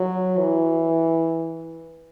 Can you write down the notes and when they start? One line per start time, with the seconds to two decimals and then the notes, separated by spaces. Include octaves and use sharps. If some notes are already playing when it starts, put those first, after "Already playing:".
Already playing: F#3
0.38 E3